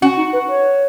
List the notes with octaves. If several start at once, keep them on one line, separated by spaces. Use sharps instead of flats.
C#4 F#4
D#4
B4
C#5